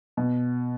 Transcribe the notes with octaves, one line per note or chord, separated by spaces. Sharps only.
B2